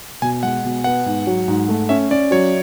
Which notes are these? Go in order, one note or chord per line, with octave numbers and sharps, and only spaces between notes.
B2 G#5
G#3 F#5
B2
B3 F#5
G#2
F#3
G#2
A3
C#4 E5
C#4 D5
F#3 C#5